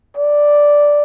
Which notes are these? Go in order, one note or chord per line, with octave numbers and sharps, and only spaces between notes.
D5